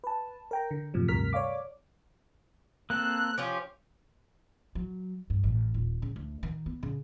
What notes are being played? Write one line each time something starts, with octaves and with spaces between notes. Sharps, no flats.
B4 A5
A#4 G5 A#5
D3
F#2 A2 C3 F3
D2 G2 C3 A#4 F6 B6
C#5 D5 F5 D6
A#3 C4 A4 F#6
F3 C#4 F4 G4
F#3
G2
A1
D#1
C#3
D2
D#3
B3
C#3